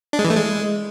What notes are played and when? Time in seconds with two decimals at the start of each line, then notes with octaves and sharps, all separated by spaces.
0.13 D4
0.19 G#3
0.24 E3
0.30 A3
0.36 G#3